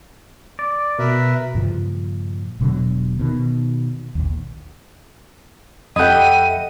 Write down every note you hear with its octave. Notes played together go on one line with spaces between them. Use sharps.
D5
B2 A#4 B4 E5
G2 A#2 C#3 F3
E1 B2 D3 F#3
B2 D#3
A#1 D#2
F2 E4 G4 A4 D#5 F#5 D#7